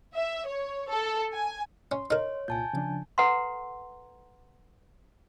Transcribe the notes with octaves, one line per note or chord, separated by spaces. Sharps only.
E5
C#5
A4
G#5
C#4 C6
D#4 A#4 C#5
C2 A#2 F4 G#5 A5 G6
C#3 F3 D4
A4 B4 F#5 A#5 C6